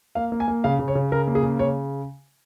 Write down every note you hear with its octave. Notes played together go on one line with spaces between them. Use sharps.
A#3 F5
A#3
G#5
A#3
C#3 F5
C#3
C#5
C#3
C#3 A#4
A#3
G#4
C#3
C#3 C#5